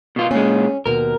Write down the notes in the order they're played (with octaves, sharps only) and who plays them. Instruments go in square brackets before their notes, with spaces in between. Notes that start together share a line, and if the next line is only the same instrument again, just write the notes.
[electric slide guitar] B2 F4
[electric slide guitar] A#2 G#3 [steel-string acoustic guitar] C#4
[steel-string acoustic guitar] D#2 B2 [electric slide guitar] A#4